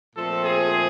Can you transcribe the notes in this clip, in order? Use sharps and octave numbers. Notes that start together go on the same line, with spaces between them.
A#2 F3 A3 C4 A4
G#4